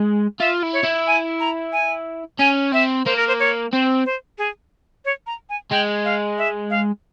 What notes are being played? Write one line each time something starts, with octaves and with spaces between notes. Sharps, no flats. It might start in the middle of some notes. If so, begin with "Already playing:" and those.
Already playing: G#3
F4 E5
E4
C#5
E4
G#5
A#5
G#5
C#4 G#5
C4 E5
A#3 C5
A#4
C5
C#5
C4 C5
C5
G#4
C#5
A#5
G#5
G#3 G5
F5
E5
F5